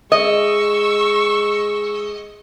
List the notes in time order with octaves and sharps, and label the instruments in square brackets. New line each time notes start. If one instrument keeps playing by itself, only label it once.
[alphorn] G#3 [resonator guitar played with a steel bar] D#5 [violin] C#6 E6